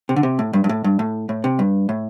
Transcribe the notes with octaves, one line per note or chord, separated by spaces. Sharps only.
C3
D3
C3
A2
G2
G2
A2
G2
A2
A2
C3
G2
A2